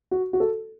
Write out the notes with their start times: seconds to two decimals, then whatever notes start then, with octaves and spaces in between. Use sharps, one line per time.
0.11 F#4
0.33 F#4
0.40 A4